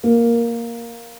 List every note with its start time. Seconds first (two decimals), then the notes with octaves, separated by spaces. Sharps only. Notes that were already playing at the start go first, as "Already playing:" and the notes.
0.03 A#3